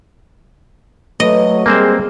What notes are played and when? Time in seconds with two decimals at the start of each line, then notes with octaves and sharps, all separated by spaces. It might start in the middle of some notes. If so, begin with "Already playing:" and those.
1.20 F#3 A3 B4 D#5
1.66 G3 G#3 A#3 C4 C5